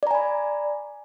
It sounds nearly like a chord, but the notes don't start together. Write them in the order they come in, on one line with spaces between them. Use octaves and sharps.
D5 A#5 G#5 B5